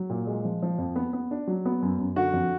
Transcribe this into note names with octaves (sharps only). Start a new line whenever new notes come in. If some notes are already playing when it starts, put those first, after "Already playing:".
Already playing: F#3
A#2
G#3
F3
F3
F2
B3
B3
D4
F#3
B3
F#2
F#2
D3 F#4
F2